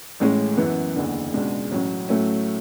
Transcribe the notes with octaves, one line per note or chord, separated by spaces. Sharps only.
A1 A2 G#3 C#4
F#2 E3 B3
F#1 E2 D3
C#2 B2 G#3 D4
A1 A2 F#3 C#4
A2 F#3 A3 C#4